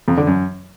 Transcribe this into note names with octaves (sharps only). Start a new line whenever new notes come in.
F2
D3
F#2